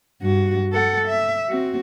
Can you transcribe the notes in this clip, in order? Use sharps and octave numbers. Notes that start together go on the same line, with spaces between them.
G2 F#4
A4 F#5
E5
C4 F#4